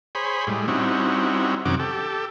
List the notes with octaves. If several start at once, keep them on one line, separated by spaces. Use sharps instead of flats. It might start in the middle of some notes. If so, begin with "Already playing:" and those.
G#4 C5 C#5 B5
A2 G3 G#3
G3 C4 C#4 D#4 E4 F#4
F#2 C3 D#3 C#4 F#4 D6
G4 A4